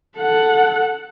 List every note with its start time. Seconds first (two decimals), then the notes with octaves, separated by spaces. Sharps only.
0.18 A4 F#5